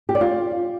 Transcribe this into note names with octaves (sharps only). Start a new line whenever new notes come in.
G4
D5
F4